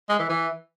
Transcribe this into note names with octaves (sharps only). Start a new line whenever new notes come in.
G#3
E3
E3